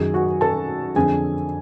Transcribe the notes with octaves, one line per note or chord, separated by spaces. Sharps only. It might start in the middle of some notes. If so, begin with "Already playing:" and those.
Already playing: F#2 D#3 G#4 G#5
F#4 F#5
A4 A5
F2 D3 G#4 G#5